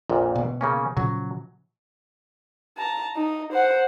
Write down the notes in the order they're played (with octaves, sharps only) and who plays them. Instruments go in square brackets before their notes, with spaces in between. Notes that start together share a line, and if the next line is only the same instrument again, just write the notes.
[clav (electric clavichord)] A#1 F2 A#2
[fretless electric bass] B2
[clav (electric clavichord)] C#3 A#3 C#4
[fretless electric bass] A#2 C#3 F3 [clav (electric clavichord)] F#3
[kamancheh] A5 A#5
D#4
C5 F#5